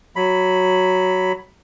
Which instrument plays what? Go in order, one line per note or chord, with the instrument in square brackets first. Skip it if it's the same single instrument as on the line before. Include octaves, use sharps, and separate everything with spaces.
[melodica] F#3 B5